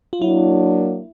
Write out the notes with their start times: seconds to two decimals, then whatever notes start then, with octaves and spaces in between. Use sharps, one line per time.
0.13 F4
0.21 F#3 A#3 D4 E4